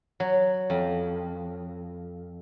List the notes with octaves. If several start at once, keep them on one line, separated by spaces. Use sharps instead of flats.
F#3
F2